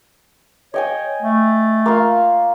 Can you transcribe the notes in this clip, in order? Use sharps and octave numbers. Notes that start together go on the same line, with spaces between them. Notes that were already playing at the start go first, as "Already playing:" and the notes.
C#5 D#5 G5 G#5
A3
A#3 F4 F5